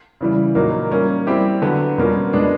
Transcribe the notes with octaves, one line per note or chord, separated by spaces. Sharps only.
C#3 E3 G3
A#2 F#3 A#3 D#4
G3 A#3 C#4
G3 C4 E4 G4
D3 F#3 B3
B2 G3 A#3 C#4 F4
B2 G#3 B3 D4